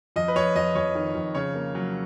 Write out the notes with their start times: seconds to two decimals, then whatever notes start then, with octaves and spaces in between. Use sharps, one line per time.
0.16 F2 D#5
0.28 B4
0.36 F2 C#5
0.56 F2 D#5
0.75 F2 C#5
0.95 D#3
1.15 F2
1.35 C#3 C#5
1.55 A#3
1.75 F#3